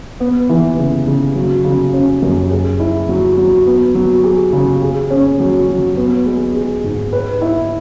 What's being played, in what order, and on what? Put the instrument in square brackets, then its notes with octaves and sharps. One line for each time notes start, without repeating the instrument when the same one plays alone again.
[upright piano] B3
E3
C#3
C#3
F#3
C#3
C#4
F#2
G#4
E4
F#3
F#3
B3
F#3
G#4
C#3
G#4
C#4
F#3
F#3
B3
G#3
G#4
G#2
B4
E4